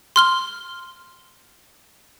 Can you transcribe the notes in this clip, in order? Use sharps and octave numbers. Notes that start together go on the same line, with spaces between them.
C6 F6 G7